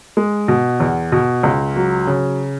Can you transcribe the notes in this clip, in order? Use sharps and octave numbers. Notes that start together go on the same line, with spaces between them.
G#3
B2
E2
B2
C#2
F#3
C#3